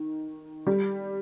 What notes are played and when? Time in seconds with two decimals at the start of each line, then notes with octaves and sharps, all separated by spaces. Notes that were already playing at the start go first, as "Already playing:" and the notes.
Already playing: D#3
0.67 G3